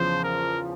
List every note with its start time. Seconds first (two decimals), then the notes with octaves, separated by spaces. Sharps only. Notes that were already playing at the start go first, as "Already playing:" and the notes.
Already playing: E2 C#3 F3 C5
0.24 A#4